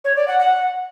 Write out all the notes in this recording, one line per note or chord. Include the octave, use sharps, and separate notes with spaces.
C#5
D5
F#5
F#5